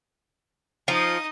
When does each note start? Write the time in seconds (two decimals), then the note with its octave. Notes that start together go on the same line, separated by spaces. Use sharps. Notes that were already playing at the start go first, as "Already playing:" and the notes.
0.88 F3 D#4 D#5